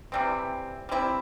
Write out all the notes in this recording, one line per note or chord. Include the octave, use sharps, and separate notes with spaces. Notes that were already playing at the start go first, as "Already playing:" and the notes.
C3 E3 G3 C4
G3 C4 E4